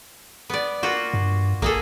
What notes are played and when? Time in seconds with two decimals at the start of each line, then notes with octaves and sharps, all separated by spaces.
0.50 B3 D5
0.83 A#3 F4 F#4
1.14 G2
1.62 A#1 A#3 G#4 A4